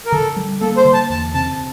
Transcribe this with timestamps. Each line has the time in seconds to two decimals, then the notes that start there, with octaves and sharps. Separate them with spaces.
0.06 A#4
0.12 D3 A4
0.36 G3
0.61 A#3 A4
0.77 C5
0.85 D3
0.94 A5
1.10 E2 A5
1.34 C3 A5